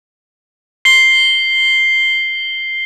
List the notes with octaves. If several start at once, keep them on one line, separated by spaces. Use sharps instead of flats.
C7 G7